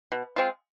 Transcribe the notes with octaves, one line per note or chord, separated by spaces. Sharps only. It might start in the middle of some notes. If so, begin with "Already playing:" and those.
B2
G#3 C4 F4